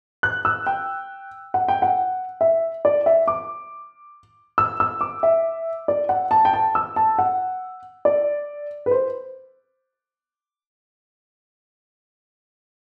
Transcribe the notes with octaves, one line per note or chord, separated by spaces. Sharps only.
F#6
E6
G5
F#5
G5
F#5
E5
D5
E5
D6
E6
E6
D6
E5
D5
F#5
A5
G5
A5
E6
A5
F#5
D5
B4
C5